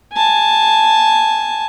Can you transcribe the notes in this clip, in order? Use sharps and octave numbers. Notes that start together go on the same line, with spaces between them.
G#5 A5